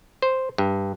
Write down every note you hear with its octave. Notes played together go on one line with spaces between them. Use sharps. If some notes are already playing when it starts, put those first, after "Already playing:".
C5
G2